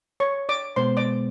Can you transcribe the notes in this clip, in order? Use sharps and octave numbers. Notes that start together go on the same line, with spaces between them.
C#5 C#6
D5 D6
B2 G#3 B3 C5 C6
D5 D6